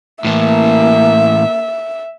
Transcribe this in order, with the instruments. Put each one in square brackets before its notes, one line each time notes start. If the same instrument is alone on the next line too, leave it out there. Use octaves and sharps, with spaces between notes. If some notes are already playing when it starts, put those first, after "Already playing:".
[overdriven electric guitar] A2 E3 [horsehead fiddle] A#3 [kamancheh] E5